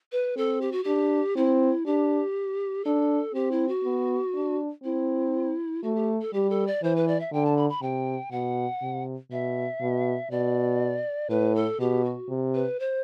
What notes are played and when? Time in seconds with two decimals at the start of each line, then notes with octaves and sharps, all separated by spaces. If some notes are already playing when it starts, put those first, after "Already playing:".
0.12 B4
0.36 C4 A4
0.61 G4
0.72 F#4
0.84 D4 G4
1.36 C4 E4
1.86 D4 G4
2.85 D4 A4
3.34 C4 G4
3.51 E4
3.68 F#4
3.84 B3
4.35 D4
4.83 C4 E4
5.83 A3 F#4
5.95 G4
6.21 A4
6.33 G3 G4
6.50 A4
6.67 D5
6.83 E3 C5
6.96 B4
7.08 D5
7.20 E5
7.33 D3 G5
7.45 A5
7.57 B5
7.69 B5
7.82 C3 G5
8.31 B2 F#5
8.82 C3
9.31 B2 E5
9.81 B2
10.31 B2 D5
11.30 A2 B4
11.55 A4
11.80 B2 G4
12.05 F#4
12.29 C3
12.55 B4
12.80 C5